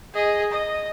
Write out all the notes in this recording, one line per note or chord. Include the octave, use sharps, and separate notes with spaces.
G#4 D#5
D#5